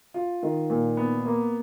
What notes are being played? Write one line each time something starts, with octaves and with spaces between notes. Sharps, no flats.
F4
D#3
A#2
B3
A#3